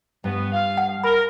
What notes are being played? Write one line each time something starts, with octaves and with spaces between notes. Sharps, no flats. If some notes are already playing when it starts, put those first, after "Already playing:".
G2 B3
F5
F#5
A#4 B5